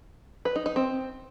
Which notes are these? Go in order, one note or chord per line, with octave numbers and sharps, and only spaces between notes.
B4
D#4
D#4
C4